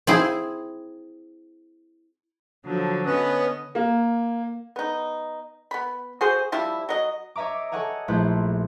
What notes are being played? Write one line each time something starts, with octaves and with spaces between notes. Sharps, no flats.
C4 E4 G#4
D3 F3 F#3
B3 C#4 B4 D#5
A#3
B3 D#4
B3 B5
F#4 G#4 C5
F3 G3 E4
F#3 D#5
C#5 D#5 E5 A#5 D6
A4 C#5 D#5 F#5 G#5 A#5
A#1 A3 E4 C5 F#6